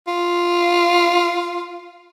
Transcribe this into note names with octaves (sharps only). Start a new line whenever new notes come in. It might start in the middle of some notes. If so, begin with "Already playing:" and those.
F4